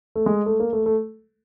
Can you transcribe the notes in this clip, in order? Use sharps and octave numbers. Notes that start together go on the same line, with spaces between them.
A3
G#3
A3
A#3
A3
A3